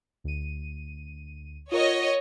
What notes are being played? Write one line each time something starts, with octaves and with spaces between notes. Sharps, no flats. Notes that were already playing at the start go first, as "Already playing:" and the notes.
D2 D#7
F4 A#4 C#5 D#5 F#5